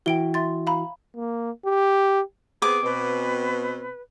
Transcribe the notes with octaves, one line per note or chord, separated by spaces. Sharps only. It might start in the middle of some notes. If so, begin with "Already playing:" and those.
E3 E4 F#4 G5 D7 G7
E5 C6 A6
F5 A#5 B5
A#3
G4
B3 C4 G#4 D6
B2 C4 B4